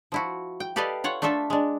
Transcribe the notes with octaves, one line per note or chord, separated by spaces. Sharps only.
F3 E4 F#4
G5
G4 A4 B4 D5 D#5 F5
F4 C#5 F#5
A3 D4 F4 A4 E5
G#3 D4